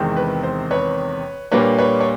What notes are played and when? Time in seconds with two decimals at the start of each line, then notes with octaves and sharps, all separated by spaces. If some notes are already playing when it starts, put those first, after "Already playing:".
Already playing: E2 C3 D#3 G#3 C4
0.16 B4
0.44 C5
0.71 B4 C#5
1.52 A#2 G3 A#3 D4 B4 C#5
1.78 B4 C#5
2.01 C#5